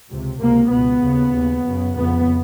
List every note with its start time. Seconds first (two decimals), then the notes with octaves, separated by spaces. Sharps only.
0.10 C#2 C3
0.40 C#2 C3 A#3
0.71 C#2 B2 B3
1.02 D#2 C#3
1.34 D#2 C#3
1.65 F#2 C#3
1.95 F2 C#3 B3